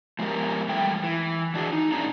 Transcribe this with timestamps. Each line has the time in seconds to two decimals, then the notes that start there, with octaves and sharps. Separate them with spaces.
0.19 F3 G#3 B3 G4 A#4
0.69 E2 G3 A3 G5
1.04 E3
1.54 E3 D4 F#4 G#4
1.72 D#4
1.92 A#2 G#3 C#4 D4 A#5